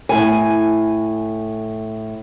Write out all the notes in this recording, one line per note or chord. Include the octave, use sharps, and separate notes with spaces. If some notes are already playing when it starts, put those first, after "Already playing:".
A2 G#5